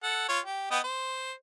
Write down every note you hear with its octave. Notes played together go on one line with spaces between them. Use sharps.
A4 F#5
F4 C#5
G4
B3 D#5 G5
C5